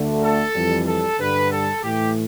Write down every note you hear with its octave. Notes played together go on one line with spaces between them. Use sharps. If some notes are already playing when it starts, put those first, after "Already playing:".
Already playing: D2 D3 A3
A4
F2 E3 G3
A4
G2 D3 G3 B4
A4
A2 E3 A3 G4